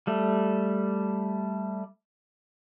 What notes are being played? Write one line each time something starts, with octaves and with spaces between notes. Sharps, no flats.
G3 A3